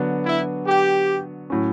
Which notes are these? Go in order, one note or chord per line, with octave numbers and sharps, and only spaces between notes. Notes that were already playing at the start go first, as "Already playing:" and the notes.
Already playing: D3 F#3 B3 D4 F#4
E4
G4
A2 F#3 C#4